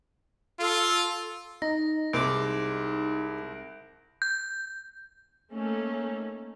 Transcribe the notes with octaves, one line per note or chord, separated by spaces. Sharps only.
F4 A4
D#4 A#6
C2 C3 G#3 D6 D7
G6
A3 A#3 C#4 D#4 A4